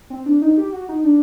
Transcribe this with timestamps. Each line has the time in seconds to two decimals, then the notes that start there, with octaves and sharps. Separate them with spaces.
0.10 C4
0.26 D4
0.42 D#4
0.58 G4
0.72 F#4
0.89 D#4
1.04 D4